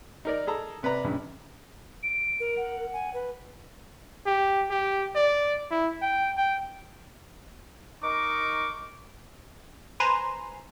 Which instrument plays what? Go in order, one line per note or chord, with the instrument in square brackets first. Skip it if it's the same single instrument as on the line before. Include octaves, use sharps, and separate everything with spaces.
[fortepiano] D#4 A#4 D5
G#4 A4 A#5
C3 B4 D5 A#5
A#1 G2 C#3
[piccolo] D7
[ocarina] A#4
[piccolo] F#5
[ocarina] G#5
B4
[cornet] G4
G4
D5
E4
G5
G5
[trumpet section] D#4 A#4 D#5 C#6 D6
[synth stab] B4 C5 G#5 A#5 C6